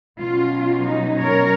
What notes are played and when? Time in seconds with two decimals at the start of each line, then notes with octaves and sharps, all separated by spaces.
0.19 B2 F#3 C#4 F4
0.87 D#4
1.21 A#4 C#5